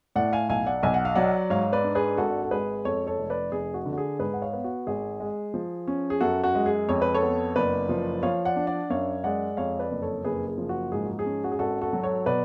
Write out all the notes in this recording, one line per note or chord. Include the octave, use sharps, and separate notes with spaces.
A2 D5 F#5
F5 G#5
B1 F5 G#5
D5 F#5
B1 G#5
F#5
F5
F#3 D5 F#5
G#2 C#5 F5
B4 D5
D4
G#4 B4
G#1 F#4 A4
A4
G#3 G#4 B4
F2 A4 C#5
A4 C#5
F1
B4 D5
F1 G#4
F#4
D3
F#4
G#4
G#2 G#4 B4
F#5
C#5 F5
B3
F#4
G#1 G#4
G#3
F3
C#4
G#4
F#2 F#4 A4
F#4
G#3
G#4
F2 C#5
B4
A4 C#5
B3
F#1 B4 D5
F3
F3 C#5 F5
D5 F#5
D4
D5 F#5
F#2 C#5 F5
G#3 D5 F#5
F2 C#5 F5
B4 D5
F#1
A4 C#5
F#1 G#4 B4
G#4
F3
F#4
G#2 G#4
F#4
G#4
C#4
F#4
G#4
G#1 F#4 A4
F#4 A4
F#3
A4 C#5
B2 B4 D5